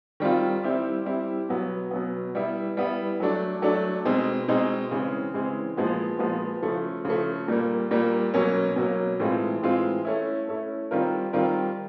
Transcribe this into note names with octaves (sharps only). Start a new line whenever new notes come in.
D#3 G3 C4 F4
G3 C4 E4 G4
G3 C4 E4 G4
B2 F#3 B3
B2 F#3 B3
G3 B3 E4
G3 B3 E4
F#3 A3 D4
F#3 A3 D4
B2 G#3 C4 D#4
B2 G#3 C4 D#4
C#3 E3 G#3 C4
C#3 E3 G#3 C4
A#2 F3 G#3 B3
A#2 F3 G#3 B3
C#3 F3 A3
C#3 F3 A3
A#2 G3 A#3
A#2 G3 A#3
B2 F#3 A#3 C#4
B2 F#3 A#3 C#4
A2 E3 G#3 C4 F4
A2 E3 G#3 C4 F4
A3 C#4 E4
A3 C#4 E4
D#3 G3 C4 F4 A#4
D#3 G3 C4 F4 A#4